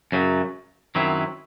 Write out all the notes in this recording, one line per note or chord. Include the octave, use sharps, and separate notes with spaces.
F#2 C#3 F#3
F#2 D#3 F#3 C4 E4